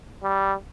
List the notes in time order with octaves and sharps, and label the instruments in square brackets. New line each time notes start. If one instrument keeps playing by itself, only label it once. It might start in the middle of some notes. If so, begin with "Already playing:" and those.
[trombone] G3